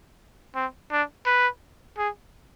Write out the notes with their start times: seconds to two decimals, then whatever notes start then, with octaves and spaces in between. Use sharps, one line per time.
0.55 C4
0.91 D4
1.26 B4
1.98 G#4